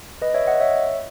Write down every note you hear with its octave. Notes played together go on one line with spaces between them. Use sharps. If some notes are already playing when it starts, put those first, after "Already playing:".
B4 D#5
C#5 E5
D#5 F#5
C#5 E5